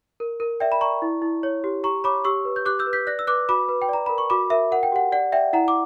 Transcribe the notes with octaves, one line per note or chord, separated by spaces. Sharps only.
A#4
A#4
D5 E5 G5
B5
D5 A#5 C#6
E4
E4
C#5
G4
G4 A#5 C#6
C#5 B5 D6
G4 C#6 E6
B4
G6
G4 D6 F#6
E6 G6
B4
G6 B6
D5 F#6 A#6
E6
B4 D6 F#6
F#4 B5 D6
B4
G5
D5 A#5
A#4 B5
C#6
F#4 B5 D6
A#4 E5
A#4 F#5
G5
G4 F#5
D5 F#5
D5 E5 G5
E4 F#5 A#5
D6